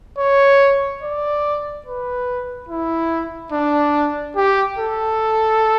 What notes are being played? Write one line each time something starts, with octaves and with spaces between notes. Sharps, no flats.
C#5
D5
B4
E4
D4
G4
A4